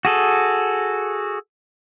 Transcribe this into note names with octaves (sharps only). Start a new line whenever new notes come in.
F#4 G#4 A4